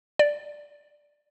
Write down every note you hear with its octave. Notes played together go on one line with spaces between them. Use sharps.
D5